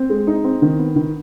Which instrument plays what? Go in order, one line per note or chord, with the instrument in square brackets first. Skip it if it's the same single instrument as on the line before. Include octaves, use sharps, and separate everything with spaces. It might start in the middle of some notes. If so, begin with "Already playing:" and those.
Already playing: [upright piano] C4
G#3
D#4
C4
D#3
B3
D#3